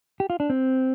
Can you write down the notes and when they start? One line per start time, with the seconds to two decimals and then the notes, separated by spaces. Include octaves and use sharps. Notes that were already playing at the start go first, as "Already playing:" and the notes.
0.20 G4
0.30 F4
0.40 D4
0.50 C4